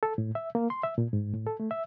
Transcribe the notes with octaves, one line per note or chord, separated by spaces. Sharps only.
A4
A2
E5
A#3
C6
E5
A#2
G#2
A2
A4
A3
E5